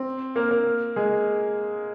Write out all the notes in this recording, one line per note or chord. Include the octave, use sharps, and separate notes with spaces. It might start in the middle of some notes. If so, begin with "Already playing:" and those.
Already playing: C4
A#3 A#4
A#3 A#4
G#3 G#4